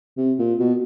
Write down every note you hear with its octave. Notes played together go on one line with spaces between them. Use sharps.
C3
A#2
B2